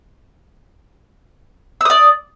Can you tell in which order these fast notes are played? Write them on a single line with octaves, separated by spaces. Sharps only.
E6 D#6 D5